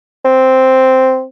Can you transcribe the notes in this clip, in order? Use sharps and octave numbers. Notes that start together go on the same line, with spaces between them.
C4